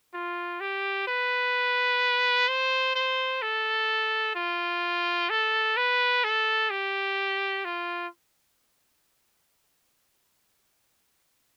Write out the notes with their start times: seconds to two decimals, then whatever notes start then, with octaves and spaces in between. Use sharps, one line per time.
0.14 F4
0.60 G4
1.07 B4
2.48 C5
2.95 C5
3.42 A4
4.35 F4
5.30 A4
5.77 B4
6.24 A4
6.70 G4
7.65 F4